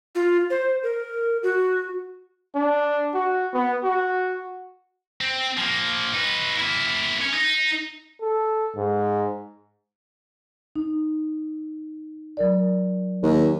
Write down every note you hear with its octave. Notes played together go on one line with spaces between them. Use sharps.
F4
C5
A#4
F#4
D4
F#4
B3
F#4
C4
F3 A#3
D#4 B4
A#3 E4
C#4
D#4
A4
G#2
D#4
F#3 A#4 D5
D#2